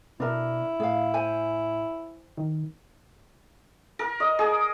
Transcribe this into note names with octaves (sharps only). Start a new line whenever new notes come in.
B2 D4 E4 A#4
A2 G#4 F5
C5 G#5
D#3
A#4
D#5
G#4